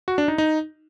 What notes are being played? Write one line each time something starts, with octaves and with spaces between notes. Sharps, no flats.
F#4
D4
D#4
D#4